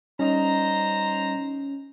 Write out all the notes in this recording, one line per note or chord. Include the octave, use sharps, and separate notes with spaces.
G3 C#4 D#4 C5 D#5 A#5